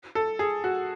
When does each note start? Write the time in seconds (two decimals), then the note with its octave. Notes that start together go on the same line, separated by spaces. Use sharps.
0.15 A4
0.39 G#4
0.64 F#4